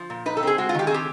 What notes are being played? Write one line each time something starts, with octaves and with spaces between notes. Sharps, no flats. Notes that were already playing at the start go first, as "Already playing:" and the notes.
Already playing: F3
A#2
D#4 B4
A4
C4 G#4
G#3 F#4
F4
D#3 G4
G#4
C4 G4